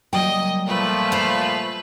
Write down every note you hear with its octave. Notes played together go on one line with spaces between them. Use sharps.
F#3 G3 A#3 D#5 G5
A#2 F3 A3 B4
C5 F5 C6 C#6